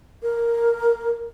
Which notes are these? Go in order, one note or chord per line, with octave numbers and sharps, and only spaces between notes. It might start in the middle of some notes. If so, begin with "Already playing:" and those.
A#4